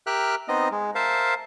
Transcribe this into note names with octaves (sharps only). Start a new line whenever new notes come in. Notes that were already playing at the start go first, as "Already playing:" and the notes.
G4 A#4 E5 G5 F6 F#6
B3 C4 D#4 D#5
G#3
A#4 C5 E5 F5 A5